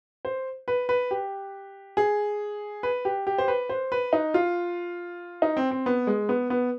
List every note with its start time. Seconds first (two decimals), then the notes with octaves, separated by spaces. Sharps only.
0.25 C5
0.68 B4
0.89 B4
1.11 G4
1.97 G#4
2.83 B4
3.05 G4
3.27 G4
3.38 C5
3.48 B4
3.70 C5
3.92 B4
4.13 D#4
4.34 F4
5.42 D#4
5.57 C4
5.71 C4
5.86 B3
6.07 G#3
6.29 B3
6.50 B3